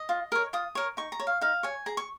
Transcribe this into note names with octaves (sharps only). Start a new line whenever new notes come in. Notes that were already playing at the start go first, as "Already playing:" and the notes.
Already playing: D#5
F4
A#4 C#5
F4 D#6
A#4 C#5
D#4 C#6
A#5
C#5
F5
D#4 F5
C#5 G#5
G#4 A#5
C#6